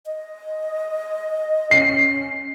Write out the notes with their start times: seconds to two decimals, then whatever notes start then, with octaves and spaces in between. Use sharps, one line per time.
0.06 D#5
1.71 C#4 C7